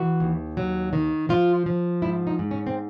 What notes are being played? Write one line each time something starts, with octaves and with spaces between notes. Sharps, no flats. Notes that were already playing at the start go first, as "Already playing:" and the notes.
Already playing: E3 F#4
D#2
F#3
D#3
F3 F4
F3
G#2 E4
D#4
G#2
C#4
C4